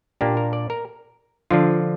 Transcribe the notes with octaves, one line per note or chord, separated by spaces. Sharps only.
A#2 A#3 D4 G4
A#4
D5
A#4
D3 F3 D4 F4